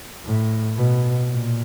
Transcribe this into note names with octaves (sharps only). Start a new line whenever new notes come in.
A2
B2
A#2